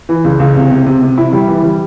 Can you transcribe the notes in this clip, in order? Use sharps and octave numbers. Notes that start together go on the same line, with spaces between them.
E3
C#2
C#2
C3
C3
C3
C3
E4
G3
E3
G3